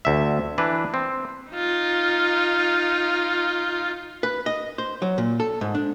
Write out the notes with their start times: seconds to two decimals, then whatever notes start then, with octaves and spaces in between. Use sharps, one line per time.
0.05 D2 E5
0.58 E3 D4 B4
0.94 C4
1.51 D#4 F4
4.23 B4
4.46 D#5
4.78 C5
5.02 F#3
5.18 A#2
5.40 A4
5.61 G#2
5.75 D4